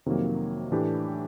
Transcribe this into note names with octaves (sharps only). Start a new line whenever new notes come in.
F2 C3 D#3 F#3 A#3
A2 E3 A3 D4 G4